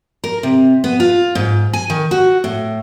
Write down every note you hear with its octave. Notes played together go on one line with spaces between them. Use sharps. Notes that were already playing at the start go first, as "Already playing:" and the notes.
A#4
C3
B3
F4
G#2
G#5
D#3
F#4
A2